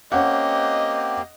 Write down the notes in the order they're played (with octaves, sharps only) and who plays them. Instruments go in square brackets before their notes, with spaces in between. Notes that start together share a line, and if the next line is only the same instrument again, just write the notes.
[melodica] A#3 C4 G4 [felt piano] C#4 F#5 [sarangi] D#5